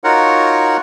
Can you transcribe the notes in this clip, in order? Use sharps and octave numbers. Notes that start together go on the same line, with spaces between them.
D#4 F4 F#4 A#4 C#5 F#5